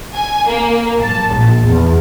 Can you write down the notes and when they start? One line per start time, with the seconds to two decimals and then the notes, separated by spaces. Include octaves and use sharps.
0.15 G#5
0.48 A#3
1.03 A5
1.36 A#1
1.67 E2